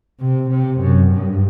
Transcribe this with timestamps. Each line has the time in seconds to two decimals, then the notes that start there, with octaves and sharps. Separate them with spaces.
0.20 C3
0.51 C3
0.81 F#2
1.11 G2